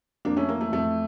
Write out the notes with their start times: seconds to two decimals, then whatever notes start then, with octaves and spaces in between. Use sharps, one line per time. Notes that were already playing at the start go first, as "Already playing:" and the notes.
0.25 F2 A#3 D4
0.37 A3 C#4
0.49 E3 A#3
0.61 A3
0.72 F2 A3